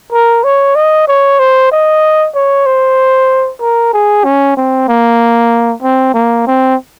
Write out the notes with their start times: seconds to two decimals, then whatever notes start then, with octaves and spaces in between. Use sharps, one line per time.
0.13 A#4
0.44 C#5
0.75 D#5
1.08 C#5
1.39 C5
1.72 D#5
2.35 C#5
2.66 C5
3.61 A#4
3.93 G#4
4.25 C#4
4.57 C4
4.89 A#3
5.82 C4
6.14 A#3
6.47 C4